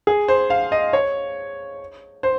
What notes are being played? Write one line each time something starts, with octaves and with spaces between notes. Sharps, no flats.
G#4
C5
F5
D#5
C#5
C5